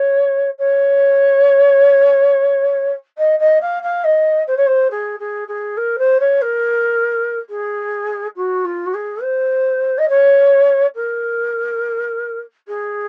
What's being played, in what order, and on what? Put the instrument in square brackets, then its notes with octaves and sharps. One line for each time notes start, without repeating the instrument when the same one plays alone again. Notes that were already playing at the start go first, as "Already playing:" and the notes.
Already playing: [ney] C#5
C#5
D#5
D#5
F5
F5
D#5
C5
C#5
C5
G#4
G#4
G#4
A#4
C5
C#5
A#4
G#4
F#4
F4
F#4
G#4
C5
D#5
C#5
A#4
G#4